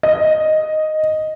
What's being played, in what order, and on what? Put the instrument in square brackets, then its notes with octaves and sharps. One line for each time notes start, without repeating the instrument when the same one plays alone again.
[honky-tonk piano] D#5